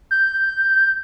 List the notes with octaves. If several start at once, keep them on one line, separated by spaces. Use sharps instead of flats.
G6